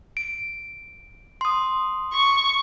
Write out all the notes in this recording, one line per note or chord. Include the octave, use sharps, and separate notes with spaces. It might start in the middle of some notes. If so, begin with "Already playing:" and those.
D7
C6 D#6
C#6